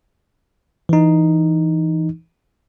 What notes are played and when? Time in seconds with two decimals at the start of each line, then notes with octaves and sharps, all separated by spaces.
0.89 E3 D#4